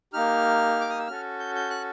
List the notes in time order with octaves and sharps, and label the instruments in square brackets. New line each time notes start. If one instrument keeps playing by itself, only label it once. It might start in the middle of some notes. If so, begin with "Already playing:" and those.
[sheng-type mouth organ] A#3 D#4 G4 F6
D6
D#6
E6
C#4 F#4 A4 F6
G6
G6
F#6